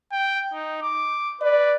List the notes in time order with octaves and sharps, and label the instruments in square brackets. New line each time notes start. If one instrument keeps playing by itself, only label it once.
[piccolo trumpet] G5
D#4
D6
[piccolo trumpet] B4 [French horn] D5